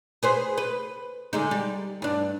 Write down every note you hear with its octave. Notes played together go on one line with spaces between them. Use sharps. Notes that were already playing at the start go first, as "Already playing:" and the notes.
G#4 B4 C5
B4
D3 G#3 D#4
G3
G2 D4